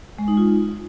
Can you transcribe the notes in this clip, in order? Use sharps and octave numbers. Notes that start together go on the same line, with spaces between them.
G#3
D#4
F4